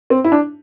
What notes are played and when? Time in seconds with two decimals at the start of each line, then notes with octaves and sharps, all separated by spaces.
0.10 C4
0.24 E4
0.32 D4